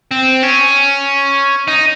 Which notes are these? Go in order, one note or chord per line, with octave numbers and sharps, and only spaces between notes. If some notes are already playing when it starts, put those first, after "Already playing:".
C4
C#4
D#4